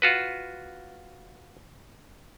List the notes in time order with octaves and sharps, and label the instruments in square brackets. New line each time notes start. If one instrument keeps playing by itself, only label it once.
[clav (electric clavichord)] F4 F#4 B4